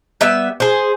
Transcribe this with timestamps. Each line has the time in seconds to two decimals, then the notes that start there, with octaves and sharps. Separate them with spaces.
0.21 G3 B3 E5
0.60 G#4 C5